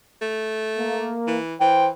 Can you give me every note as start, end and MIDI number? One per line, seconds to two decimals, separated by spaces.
0.22 1.14 57
0.78 1.37 58
1.27 1.55 52
1.61 1.91 52
1.61 1.90 72
1.61 1.86 79